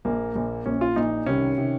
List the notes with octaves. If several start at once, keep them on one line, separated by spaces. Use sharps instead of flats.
A#1 A#2 A#3
A#1 A#2
A#1 A#2 C#4
F4
A#1 A#2 D#4
C2 C3 D#3 C#4
C3 D#3